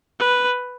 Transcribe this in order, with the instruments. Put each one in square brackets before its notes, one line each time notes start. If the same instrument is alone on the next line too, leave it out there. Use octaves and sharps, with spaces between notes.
[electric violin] B4